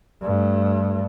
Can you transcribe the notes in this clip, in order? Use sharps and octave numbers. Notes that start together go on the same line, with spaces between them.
G2 A3